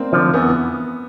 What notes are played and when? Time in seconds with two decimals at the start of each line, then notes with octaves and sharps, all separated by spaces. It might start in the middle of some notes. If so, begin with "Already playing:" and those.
Already playing: A#3 C4 D4 D#4
0.13 D3 F3
0.34 E2 B3